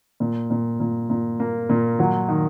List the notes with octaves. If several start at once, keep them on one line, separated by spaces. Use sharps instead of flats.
A#2
A#2
A#2
A#2
A#3
A#2
F#3
D#3